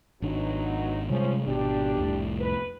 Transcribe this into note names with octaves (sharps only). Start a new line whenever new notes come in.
G#1 B2 F#3 D4 D#4
C3 F3 G3 G#3 C#4
G#1 B2 D4 G4
F1 C2 A2
B4